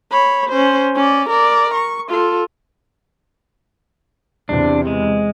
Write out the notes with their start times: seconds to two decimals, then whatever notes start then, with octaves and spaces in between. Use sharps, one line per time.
0.11 C#5 B5
0.50 C#4 C5
0.96 C#4 D5
1.30 A#4 D5
1.75 C#6
2.09 F4 A4
4.49 E2 C3 D4
4.87 G#3